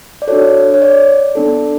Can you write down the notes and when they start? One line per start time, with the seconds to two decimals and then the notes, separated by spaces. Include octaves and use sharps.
0.22 D5
0.28 D4 F#4 A4 C#5
0.74 C#5
0.82 D5
1.35 B3 D4 A4